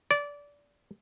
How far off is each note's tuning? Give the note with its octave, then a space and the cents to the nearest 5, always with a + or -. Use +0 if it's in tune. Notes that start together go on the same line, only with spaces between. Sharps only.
D5 -20